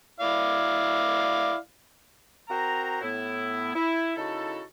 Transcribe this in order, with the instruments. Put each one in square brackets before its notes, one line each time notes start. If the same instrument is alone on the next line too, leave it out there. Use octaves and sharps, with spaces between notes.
[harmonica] E4 D5 F5
[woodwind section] C4 F#4 A#4 C5 A#5
A2 B3 E4
E4
C#3 D#4 E4 F#4 A4